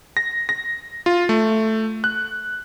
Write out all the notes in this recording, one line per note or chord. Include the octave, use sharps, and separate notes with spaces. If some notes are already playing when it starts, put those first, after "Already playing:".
A#6
A#6
F4
A3
F#6